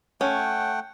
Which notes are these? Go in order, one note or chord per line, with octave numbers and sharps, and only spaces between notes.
A3 C#4 F#5 G5